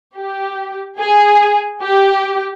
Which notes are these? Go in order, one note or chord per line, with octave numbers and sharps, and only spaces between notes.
G4
G#4
G4